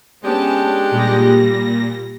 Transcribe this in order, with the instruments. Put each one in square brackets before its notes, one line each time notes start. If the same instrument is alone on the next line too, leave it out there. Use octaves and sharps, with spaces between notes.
[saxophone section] G#3 D4 G4 [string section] B3 C#4 A5
[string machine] A#2 A#6 [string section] G3